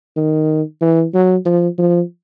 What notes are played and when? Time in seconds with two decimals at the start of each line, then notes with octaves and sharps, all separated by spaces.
0.16 D#3
0.81 E3
1.14 F#3
1.45 F3
1.78 F3